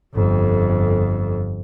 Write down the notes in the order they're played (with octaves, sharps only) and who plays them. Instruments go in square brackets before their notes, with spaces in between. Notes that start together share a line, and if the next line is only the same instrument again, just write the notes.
[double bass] G1 F2